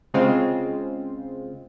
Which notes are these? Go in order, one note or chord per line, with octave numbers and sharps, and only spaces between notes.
C#3 G#3 C4 F4